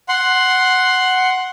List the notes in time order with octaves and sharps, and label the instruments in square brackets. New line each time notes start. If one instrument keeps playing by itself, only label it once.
[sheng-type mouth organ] F#5 C6